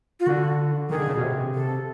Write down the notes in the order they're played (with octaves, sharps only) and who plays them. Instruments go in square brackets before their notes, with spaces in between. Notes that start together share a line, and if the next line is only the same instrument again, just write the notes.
[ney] F4
[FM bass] D3 [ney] F#4
[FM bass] D#3 [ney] G#4
[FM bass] D3
C#3
B2
C3
[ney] A4